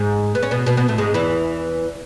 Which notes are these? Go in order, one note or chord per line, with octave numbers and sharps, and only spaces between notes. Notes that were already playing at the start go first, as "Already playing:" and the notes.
Already playing: G#2 G#3
B3
C#4
B2 B3
B2 B3
B2 B3
A2 A3
G#2 G#3
E2 E3